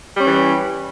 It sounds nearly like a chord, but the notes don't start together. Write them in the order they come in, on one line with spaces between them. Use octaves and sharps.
G3 C#4 E3